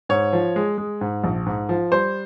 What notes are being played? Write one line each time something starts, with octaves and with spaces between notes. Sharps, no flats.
G#2 C#5
F3
G#3
G#3
G#2
A#1
G#2
F3
G3 C5